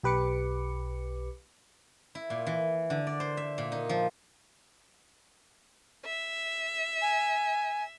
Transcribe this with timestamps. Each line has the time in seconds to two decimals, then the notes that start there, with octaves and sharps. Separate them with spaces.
0.03 B1 G4 B4 D6 C#7
2.15 E4
2.30 A#2
2.47 E3
2.90 D3
3.07 D5
3.20 C5
3.37 E5
3.58 A#2
3.72 D#4
3.89 F3
6.05 E5
7.01 G#5